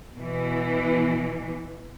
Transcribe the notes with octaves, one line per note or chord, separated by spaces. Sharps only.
B2 E3